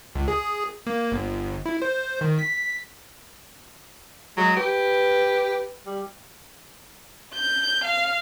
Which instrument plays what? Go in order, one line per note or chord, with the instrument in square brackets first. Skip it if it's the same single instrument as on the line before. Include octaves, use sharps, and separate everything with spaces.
[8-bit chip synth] C#2
G#4
A#3
G1
E4
C5
D#3
B6
[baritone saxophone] F#3 [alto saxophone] G#3
[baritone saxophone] G4 [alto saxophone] B4
[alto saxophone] G3
[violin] G6
F5